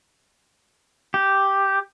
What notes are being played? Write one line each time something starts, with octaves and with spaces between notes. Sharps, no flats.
G4